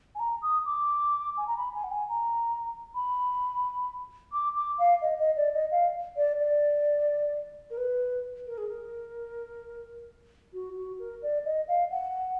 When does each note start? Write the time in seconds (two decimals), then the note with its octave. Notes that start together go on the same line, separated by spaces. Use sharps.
0.15 G#5
0.19 A#5
0.42 D#6
0.66 D6
1.37 G#5
1.47 A#5
1.57 B5
1.75 G#5
1.84 F#5
1.92 G#5
2.09 A#5
2.95 B5
4.33 D6
4.56 D6
4.79 F5
5.02 D#5
5.19 D#5
5.37 D5
5.53 D#5
5.71 F5
6.17 D5
6.40 D5
7.71 A#4
7.78 B4
8.47 A#4
8.58 G#4
8.68 A#4
10.53 F#4
10.76 F#4
10.99 A#4
11.22 D5
11.45 D#5
11.68 F5
11.91 F#5